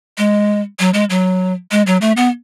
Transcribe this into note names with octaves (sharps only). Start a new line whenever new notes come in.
G#3
F#3
G#3
F#3
G#3
F#3
A3
B3